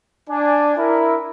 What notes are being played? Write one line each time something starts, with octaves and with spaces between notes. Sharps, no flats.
D4 G#5
E4 A#4